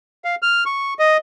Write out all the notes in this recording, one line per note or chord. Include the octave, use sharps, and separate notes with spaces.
F5
F6
C#6
D#5